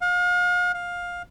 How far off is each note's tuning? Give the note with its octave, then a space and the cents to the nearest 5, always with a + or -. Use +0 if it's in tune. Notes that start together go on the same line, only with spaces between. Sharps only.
F5 +40
F5 +15